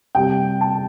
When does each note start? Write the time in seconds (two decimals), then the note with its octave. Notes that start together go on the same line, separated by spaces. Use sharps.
0.15 C3 G3 G5
0.61 A5